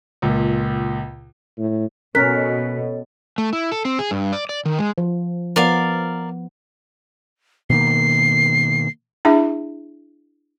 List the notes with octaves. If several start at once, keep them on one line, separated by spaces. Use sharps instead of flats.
C#2 A#2
A2
B2 C#4 A4 A#4 C#5 D#5 F#6 B6
A3
E4
A4
C4
G#4
G2
D5
D5
D#3
G#3
F3
F3 B3 A#4 D5 F5
B2 D#3 A#3 C7
D4 E4 G#4 E5